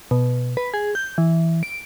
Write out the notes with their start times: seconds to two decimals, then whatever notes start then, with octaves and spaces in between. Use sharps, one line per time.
0.11 B2
0.57 B4
0.74 G#4
0.95 G6
1.18 E3
1.63 D7